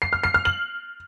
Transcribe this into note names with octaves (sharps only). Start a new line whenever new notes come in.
C7
F6
C7
F6
F#7